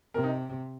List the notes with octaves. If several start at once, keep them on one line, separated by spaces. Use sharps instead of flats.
C3 A#4
D#4